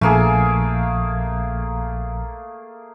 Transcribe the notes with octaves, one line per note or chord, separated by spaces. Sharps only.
A#1 A3 A#3 G#4